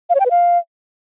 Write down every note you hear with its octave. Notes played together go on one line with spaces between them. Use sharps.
F5
C#5
G5
B4
F5